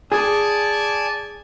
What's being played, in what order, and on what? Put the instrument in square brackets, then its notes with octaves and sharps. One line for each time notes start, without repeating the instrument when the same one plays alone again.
[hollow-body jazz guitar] G#4 [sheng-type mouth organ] D5 G#5 A5